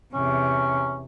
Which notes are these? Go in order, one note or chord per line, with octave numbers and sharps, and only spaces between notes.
E2 C3 C#4